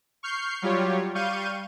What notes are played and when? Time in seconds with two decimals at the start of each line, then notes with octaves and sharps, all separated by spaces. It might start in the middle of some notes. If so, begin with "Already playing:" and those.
0.23 C#6 F6 G6 C7
0.62 F#3 G3 F4 G4 C#5
1.15 G3 F5 C#6 G6 D#7